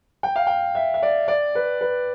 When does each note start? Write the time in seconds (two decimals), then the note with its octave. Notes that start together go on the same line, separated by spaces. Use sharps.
0.23 G5
0.36 F5
0.47 G5
0.75 E5
0.94 E5
1.03 D5
1.28 D5
1.55 B4
1.81 B4